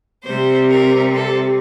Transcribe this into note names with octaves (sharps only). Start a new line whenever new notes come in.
C3 G3 C4 C5
A#4
A4